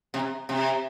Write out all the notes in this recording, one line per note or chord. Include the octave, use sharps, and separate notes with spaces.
C3
C3